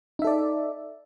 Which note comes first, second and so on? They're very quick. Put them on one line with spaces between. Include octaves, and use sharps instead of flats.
D#4 E5 A4 D5